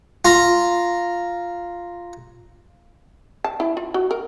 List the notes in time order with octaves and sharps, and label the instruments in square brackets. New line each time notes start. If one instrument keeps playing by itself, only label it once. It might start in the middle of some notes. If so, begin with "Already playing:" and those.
[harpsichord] F4 A#5
[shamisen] A5
E4
F4
F#4
A#4